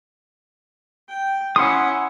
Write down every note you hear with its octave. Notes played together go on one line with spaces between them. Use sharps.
G5
C#4 E4 F#5 C6 D#6